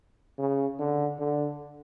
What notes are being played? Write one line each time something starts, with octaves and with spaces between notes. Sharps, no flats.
C#3
D3
D3